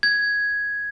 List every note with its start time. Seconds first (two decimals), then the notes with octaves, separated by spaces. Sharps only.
0.03 G#6